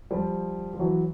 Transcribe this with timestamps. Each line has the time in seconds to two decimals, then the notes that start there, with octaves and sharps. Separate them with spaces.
0.11 F3 G3
0.73 F3
0.79 E3 F#3